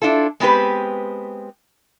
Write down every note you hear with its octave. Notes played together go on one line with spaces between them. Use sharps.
D4 E4 F4 A4
G#3 B3 C4 G4 B4